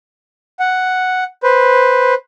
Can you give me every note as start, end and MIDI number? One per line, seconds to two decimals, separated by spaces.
0.60 1.24 78
1.43 2.14 71
1.43 2.14 72